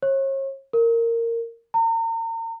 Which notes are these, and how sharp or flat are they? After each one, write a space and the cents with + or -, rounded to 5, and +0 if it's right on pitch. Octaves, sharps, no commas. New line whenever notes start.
C#5 -40
A#4 -15
A#5 -40